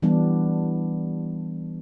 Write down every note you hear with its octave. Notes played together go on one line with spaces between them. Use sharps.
E3 G3 B3 D4